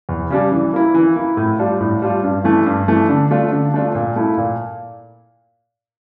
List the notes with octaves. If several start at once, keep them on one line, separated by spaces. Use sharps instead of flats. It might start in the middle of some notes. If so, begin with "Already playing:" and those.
E2
C#3 G3 D4
E3
A#3 E4
E3
A#3 E4
A2
G3 D4 F4
A2
G3 D4 F4
G2
E3 A3
G2
E3 A3
D3
A3 D4 F4
D3
A3 D4 F4
A#2
A3 E4
A#2